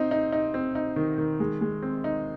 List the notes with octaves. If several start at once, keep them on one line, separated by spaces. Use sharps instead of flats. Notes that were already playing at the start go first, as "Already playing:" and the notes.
Already playing: C4 D#4
D#4
D#4
C4
D#4
D#3
D#3
G#3
G#3
C4
D#4